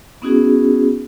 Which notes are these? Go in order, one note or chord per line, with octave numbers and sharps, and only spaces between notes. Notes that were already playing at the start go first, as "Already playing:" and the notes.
B3 C#4 D#4 E4 F#4 G#4